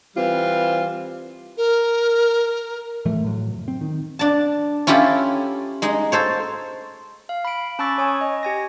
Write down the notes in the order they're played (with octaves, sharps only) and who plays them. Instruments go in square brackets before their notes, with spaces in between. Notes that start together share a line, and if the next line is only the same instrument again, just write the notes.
[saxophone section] E3 G3 C4 F4
[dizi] A#4
[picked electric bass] A2 E3 F3 A3
A2 F#3
F#1
C4
D#3
[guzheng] D4 A5
C#4 E4 F4 G4 A4
G#3 D#4
A4 C5 C#5
[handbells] F5
B5 D7
C#4 A5 B5 C#6 E6 A6
C#5 G#5 C#6 D#6
D#5
G4 G#5 A#6